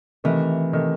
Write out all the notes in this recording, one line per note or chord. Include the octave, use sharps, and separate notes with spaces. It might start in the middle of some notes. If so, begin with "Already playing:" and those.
C3 D#3 E3 A3
C3 D#3 A3